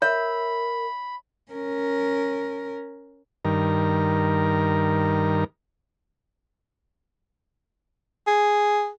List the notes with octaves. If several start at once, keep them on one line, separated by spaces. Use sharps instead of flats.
A#4 C#5 E5 B5
C#4 A#4
G2 D#3 A#4
G#4